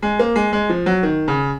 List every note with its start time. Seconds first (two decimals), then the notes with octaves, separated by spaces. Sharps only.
0.02 G#3
0.19 A#3
0.36 G#3
0.53 G#3
0.69 F3
0.86 F#3
1.03 D#3
1.28 C#3